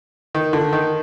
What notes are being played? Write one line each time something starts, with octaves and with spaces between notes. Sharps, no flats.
D#3
D3
D#3